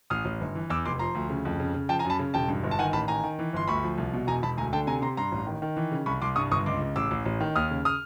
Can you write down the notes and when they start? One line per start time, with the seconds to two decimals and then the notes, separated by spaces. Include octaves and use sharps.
0.10 A1 D#6 F6
0.25 A1
0.41 G1
0.55 E3
0.70 E2 D6 E6
0.85 F1 C6 D6
0.99 F3 A#5 C6
1.15 D2
1.30 C#3
1.45 F2
1.60 C#3
1.74 C#3
1.89 F3 G5 A5
1.99 G#5 A#5
2.04 F#2
2.10 A5 B5
2.19 C#3
2.34 E1 G5 A5
2.49 G2
2.64 G1
2.71 A5
2.79 D#3 F#5 G#5
2.93 A1 A5 B5
3.08 D#3 G#5 A#5
3.24 D#3
3.39 E3
3.53 G1 C6
3.68 D2 B5 C#6
3.83 F3
3.98 C2
4.13 B2
4.27 E1 G#5 A#5
4.43 E1 A5 B5
4.57 D2 G#5 A#5
4.73 D3 G5 A5
4.87 C3 G#5 A#5
5.02 C3 A#5 C6
5.17 G2 A#5 C6
5.32 A1
5.47 D#3
5.62 D#3
5.76 E3
5.92 C#3
6.06 C2 B5 C#6
6.22 C2 C6 D6
6.36 G2 C#6 D#6
6.51 G1 C#6 D#6
6.66 C#2 C6 D6
6.81 C#3
6.96 A1 D6 E6
7.11 A1
7.26 A1
7.41 D#3
7.56 D#2 D#6 F6
7.71 C#3
7.85 D#6 F6